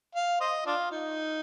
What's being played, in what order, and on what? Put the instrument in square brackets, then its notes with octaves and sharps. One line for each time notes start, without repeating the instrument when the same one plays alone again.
[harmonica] F5
C5 D#5
D4 F4
D#4